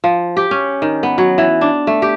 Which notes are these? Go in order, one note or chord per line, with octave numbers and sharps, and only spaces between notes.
F3
G4
C#4
D#3
B3
F#3
E3
D4
A3
G4